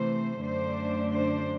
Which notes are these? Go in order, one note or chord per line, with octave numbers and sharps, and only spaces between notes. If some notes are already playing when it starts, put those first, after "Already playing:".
Already playing: C3 E3 A3 C5
F#2 D3 A3 D4 C5
C5